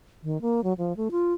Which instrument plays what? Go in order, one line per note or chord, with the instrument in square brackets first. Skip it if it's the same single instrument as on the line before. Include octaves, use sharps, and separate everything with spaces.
[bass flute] D#3
A#3
F#3
F3
A3
F4